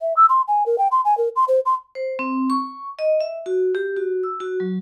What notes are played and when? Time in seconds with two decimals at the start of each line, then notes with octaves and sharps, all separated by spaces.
0.02 E5
0.17 E6
0.29 C6
0.48 G#5
0.66 A#4
0.78 G5
0.92 C6
1.05 G#5
1.18 A#4
1.36 C6
1.48 C5
1.66 C6
1.95 C5
2.19 C4
2.50 C#6
2.99 D#5
3.21 E5
3.46 F#4
3.75 G4
3.97 F#4
4.23 E6
4.40 F#4
4.60 F#3